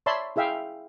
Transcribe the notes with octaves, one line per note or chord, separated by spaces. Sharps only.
C#5 D5 E5 A5 B5 C6
E4 G#4 E5 F5 G5